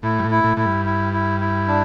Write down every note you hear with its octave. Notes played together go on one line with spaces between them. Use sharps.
A2 E4
G2
A2
E4
A2
A2 E4
G2
E4
E4
E4
D4